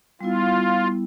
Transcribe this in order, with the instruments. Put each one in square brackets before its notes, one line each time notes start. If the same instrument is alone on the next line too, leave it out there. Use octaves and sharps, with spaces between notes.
[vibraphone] G3 B3 E4 [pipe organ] F4